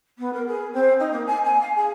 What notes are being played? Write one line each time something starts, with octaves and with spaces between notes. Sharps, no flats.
B3
A#4
G#4
C4
D#4
A#3
G#5
G#5
F5
G#4